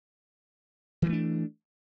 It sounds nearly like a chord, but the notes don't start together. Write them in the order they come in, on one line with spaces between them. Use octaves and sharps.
E3 F#3 A3 D4